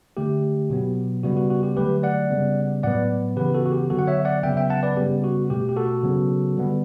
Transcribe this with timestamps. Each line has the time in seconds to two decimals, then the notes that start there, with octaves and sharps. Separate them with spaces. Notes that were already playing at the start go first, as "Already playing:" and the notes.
0.17 D3 A3 G4
0.70 B2 F#3 B3
1.23 C#3 G3 B3 F#4
1.37 F#4
1.50 F#4
1.63 G4
1.76 D3 F#3 A3 G4 B4
2.03 D5 F#5
2.30 C#3 G3 B3
2.83 A2 F#3 B3 D5 F#5
3.36 C#3 E3 B3 G4 B4
3.54 F#4 A4
3.66 F#4
3.72 G4
3.90 D3 F#3 B3 F#4 A4
3.99 F#5
4.07 C#5 E5
4.25 D5 F#5
4.43 C#3 F#3 B3 E5 G5
4.57 E5 G5
4.70 F#5 A5
4.83 B4 D5
4.97 C#3 G3 B3 G4
5.24 F#4
5.50 B2 A3 G4
5.69 G4
5.76 F#4 A4
6.03 C#3 F#3 B3
6.56 D3 G3 B3